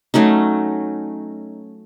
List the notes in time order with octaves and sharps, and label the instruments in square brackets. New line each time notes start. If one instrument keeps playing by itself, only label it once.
[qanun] F#3 A3 C#4 D#4